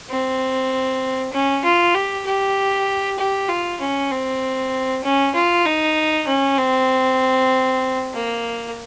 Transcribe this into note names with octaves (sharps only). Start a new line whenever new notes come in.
C4
C#4
F4
G4
G4
G4
F4
C#4
C4
C#4
F4
D#4
C#4
C4
A#3